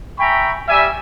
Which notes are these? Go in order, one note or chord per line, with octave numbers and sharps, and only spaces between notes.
E5 G5 G#5 A#5 B5 C#6
G3 E5 G#5